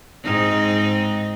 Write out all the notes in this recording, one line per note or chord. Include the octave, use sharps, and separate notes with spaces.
G#2 C4 D#4